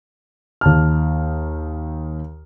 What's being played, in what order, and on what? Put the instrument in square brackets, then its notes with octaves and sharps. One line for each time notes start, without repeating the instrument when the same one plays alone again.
[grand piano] D#2 A5 F6